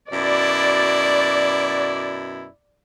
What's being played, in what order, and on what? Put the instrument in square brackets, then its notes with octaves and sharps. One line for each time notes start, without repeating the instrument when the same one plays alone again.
[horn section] F#2 B2 E4 [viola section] D5